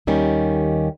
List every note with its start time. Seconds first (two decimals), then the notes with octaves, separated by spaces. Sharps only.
0.07 D#2 D#3 G3 C#4